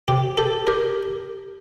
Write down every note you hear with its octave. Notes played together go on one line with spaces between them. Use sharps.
C3 G4
G4 A4
G4 A#4